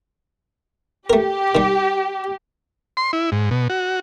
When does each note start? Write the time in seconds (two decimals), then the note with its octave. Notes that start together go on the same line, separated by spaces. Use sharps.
1.10 A3 G4 A#4
1.55 D#3 G3
2.97 C6
3.13 E4
3.32 G#2
3.51 B2
3.70 F#4